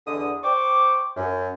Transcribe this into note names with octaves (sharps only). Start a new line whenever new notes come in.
E2 D3 D#6
C5 G5 C#6 D6
F#2